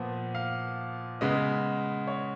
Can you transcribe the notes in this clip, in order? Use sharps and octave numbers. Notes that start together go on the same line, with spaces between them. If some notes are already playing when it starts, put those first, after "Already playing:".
Already playing: A#2 F3 B3
F5
C#3 G#3 B3 D#5
C#5